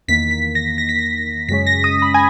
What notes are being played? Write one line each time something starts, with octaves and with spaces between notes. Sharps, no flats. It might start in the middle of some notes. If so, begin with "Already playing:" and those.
E2 D#3 A#3 B6
B6
A#6
A#6
B6
A#6
F#2 C#3 G#3 C#4 B6
A#6
D#6
B5
G#5